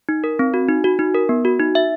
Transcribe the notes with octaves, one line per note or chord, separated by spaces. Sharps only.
D#4
A#4
C4
F#4
D#4
F#4
D#4
A#4
B3
F#4
D#4
E5